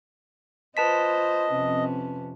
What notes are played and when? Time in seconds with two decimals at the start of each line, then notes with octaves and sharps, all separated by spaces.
0.77 F4 B4 C5 D#5 A5 B6
1.50 F2 C3 C#4